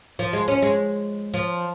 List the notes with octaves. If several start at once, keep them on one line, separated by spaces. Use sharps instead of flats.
F3
G#3
C#4
G#3
F3